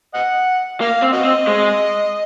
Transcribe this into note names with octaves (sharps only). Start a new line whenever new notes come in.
D#5 F#5
A#3 F5
C4
F#4 D#5
C4
G#3